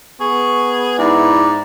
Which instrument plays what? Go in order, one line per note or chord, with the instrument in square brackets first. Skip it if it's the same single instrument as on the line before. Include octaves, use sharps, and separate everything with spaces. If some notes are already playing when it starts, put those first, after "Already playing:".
[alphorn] B3 [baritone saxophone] G#4 [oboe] C#6
[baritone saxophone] G#2 [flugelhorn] E4 [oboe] D5